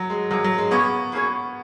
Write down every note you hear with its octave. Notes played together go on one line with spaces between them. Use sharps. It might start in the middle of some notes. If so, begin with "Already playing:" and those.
Already playing: F#3
G#3
F#2 F3 F#3 G#4
F#3
G#3
F#3 A#3 B3 C#4 G#4 C#5
F#3 A#3 C#4 G#4 C#5